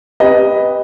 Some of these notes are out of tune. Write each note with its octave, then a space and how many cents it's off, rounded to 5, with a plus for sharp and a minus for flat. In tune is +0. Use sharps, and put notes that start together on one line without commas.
G4 +15 B4 +0 D#5 +5